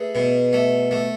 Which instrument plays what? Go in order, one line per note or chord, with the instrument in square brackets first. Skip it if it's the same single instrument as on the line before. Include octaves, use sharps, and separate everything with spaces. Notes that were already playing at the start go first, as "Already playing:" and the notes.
Already playing: [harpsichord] A3 G#4 B4
B2
A3
A3